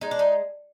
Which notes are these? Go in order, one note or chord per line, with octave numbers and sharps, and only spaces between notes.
G#3 D#4
D4
D#4